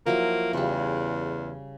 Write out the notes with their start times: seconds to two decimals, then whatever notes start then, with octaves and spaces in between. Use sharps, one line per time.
0.06 F3 F#3 A#3 E4
0.53 E2 C#3 G3